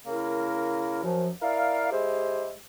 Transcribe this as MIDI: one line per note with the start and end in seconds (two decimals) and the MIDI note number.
0.06 1.02 49
0.06 1.02 58
0.06 1.02 64
0.06 1.02 70
1.03 1.29 42
1.03 1.29 53
1.41 1.90 64
1.41 1.90 70
1.41 1.90 74
1.41 1.90 77
1.92 2.52 56
1.92 2.52 64
1.92 2.52 67
1.92 2.52 68
1.92 2.52 72